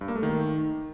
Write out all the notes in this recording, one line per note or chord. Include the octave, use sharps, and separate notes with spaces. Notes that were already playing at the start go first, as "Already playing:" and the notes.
G2
A#3
A3
D#3